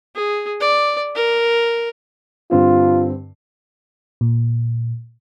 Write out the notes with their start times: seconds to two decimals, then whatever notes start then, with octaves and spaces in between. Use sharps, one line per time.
0.16 G#4
0.60 D5
1.15 A#4
2.51 G2 D3 C4 F4
4.21 A#2